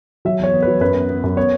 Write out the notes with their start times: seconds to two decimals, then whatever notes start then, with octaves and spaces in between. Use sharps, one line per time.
0.25 F#3 E5
0.39 E2 C#5
0.54 B3
0.62 F#3 B4
0.81 F#2 B4
0.95 B3
1.09 B3
1.24 F#2
1.37 B3 C#5